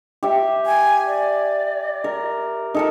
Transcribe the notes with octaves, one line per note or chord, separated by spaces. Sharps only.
G4 E5
G#5
D5
A#4
D#4 A4 A#4